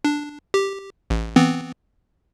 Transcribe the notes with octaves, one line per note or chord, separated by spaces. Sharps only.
D4
G4
A1
E3 B3 C4